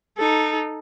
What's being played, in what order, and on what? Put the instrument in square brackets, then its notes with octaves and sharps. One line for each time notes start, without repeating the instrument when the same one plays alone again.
[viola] D#4 A4